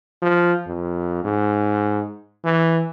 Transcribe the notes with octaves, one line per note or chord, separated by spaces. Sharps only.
F3
F2
G#2
E3